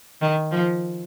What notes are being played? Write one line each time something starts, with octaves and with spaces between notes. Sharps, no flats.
D#3
F3